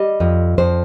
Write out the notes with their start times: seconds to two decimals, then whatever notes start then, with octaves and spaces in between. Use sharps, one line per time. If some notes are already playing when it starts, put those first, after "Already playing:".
Already playing: G3 D#5
0.20 F2
0.58 F2 C5